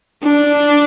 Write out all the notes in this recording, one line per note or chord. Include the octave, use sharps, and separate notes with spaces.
D4